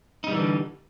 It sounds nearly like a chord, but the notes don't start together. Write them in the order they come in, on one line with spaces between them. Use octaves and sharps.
D#4 G3 E3 D3